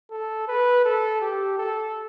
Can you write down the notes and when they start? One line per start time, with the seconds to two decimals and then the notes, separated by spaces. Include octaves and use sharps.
0.11 A4
0.48 B4
0.85 A4
1.21 G4
1.58 A4